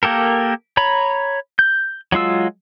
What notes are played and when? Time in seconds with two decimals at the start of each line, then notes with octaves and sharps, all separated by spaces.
0.03 A#3 G4 A4 A#4
0.77 C#5 A#5 B5
1.59 G6
2.12 F#3 G#3 F4 E6